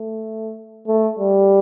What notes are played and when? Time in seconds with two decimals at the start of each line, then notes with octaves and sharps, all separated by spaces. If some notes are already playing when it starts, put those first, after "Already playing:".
Already playing: A3
0.88 A3
1.19 G3